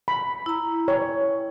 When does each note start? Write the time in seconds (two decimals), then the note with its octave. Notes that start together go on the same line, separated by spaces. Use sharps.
0.08 B5
0.46 E4 A#5
0.88 C#5 G5